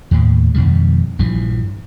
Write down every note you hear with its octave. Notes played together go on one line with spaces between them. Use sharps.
D#2 A2
F2 B2 D#3 G3
A#1 G2 E3 F3